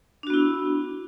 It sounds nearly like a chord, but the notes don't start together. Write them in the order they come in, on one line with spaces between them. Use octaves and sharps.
D4 F#4 B3 E4